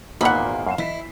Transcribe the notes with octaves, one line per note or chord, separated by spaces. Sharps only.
G#1 E2 A#2 A#3 D#4 F5 F#5 B5
F#2 F5 C7 E7
E3 E4 D#5 B6